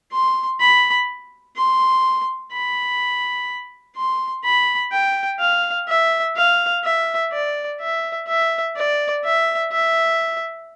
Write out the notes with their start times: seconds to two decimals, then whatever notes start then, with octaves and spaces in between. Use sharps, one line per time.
0.12 C6
0.60 B5
1.56 C6
2.52 B5
3.96 C6
4.44 B5
4.92 G5
5.39 F5
5.88 E5
6.36 F5
6.84 E5
7.33 D5
7.81 E5
8.27 E5
8.76 D5
9.24 E5
9.72 E5